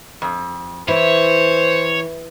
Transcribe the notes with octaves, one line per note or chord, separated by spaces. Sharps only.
F2
E3 E4 C5 C#5